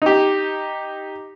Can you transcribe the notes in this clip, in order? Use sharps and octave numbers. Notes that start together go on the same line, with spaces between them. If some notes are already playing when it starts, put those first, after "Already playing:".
D#4 G4